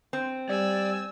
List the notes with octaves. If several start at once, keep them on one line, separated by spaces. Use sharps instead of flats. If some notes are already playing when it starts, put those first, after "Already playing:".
C4
G3 D5 G#5 E6